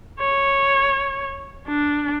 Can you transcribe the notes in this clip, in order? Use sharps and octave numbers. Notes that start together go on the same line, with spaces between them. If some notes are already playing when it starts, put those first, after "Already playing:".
C#5
D4